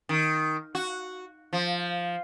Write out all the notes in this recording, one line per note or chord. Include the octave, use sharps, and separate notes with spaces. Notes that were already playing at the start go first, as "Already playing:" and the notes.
D#3
F#4
F3